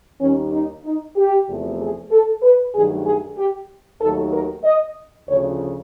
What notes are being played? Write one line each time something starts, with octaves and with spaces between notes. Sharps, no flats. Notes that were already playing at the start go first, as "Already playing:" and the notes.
D#2 D#3 G3 C#4
D#4
D#4
G4
E2 C3 F3 A3
G#4
A4
B4
G2 D#3 F#3 A3 G#4
G#4
G4
D#2 D#3 F#3 A3 A4
A#4
D#5
D2 C#3 F3 C#5